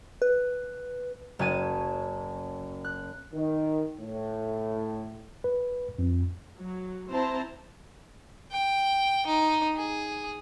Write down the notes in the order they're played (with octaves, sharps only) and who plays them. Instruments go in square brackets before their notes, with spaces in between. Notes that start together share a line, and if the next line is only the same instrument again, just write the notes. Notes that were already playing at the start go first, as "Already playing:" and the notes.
[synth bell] B4
[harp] F#1 C#4 F#4 G#5 A5 D#7
F#6
[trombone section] D#3
A2
[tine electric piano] B4
F2
[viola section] F#3
C4 E4 C5 A5 A#5
[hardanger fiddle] G5
D#4
G#4